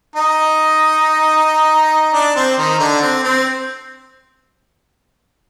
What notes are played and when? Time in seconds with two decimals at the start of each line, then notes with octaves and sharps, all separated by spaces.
0.16 D#4 D#5
2.14 D4 D5
2.36 C4 C5
2.57 D#3 D#4
2.79 D3 D4
3.02 C4
3.24 C4